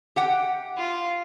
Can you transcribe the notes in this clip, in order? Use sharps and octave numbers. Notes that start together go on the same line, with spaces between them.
G4 F#5 G5
F4